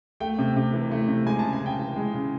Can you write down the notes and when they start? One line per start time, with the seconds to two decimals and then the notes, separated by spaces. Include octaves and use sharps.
0.20 A3 G5
0.38 C3
0.56 C3
0.74 E3
0.91 A3
1.08 C3
1.26 G#3 G#5
1.39 C#3 A5
1.53 G#5
1.61 C#3
1.66 G5
1.79 E3
1.96 G#3
2.14 C#3